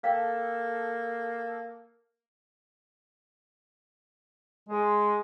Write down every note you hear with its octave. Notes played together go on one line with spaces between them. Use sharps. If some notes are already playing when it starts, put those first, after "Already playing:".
A#3 A4 F5 G5
G#3